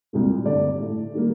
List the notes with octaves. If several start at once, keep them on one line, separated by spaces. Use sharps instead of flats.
C2 A#2 G3 A#3
G2 D3 A3 D5
A2 A3
D#3 G3 A#3